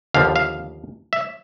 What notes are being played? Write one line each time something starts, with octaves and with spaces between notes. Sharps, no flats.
D#2 D3 F3 F5
F5
E5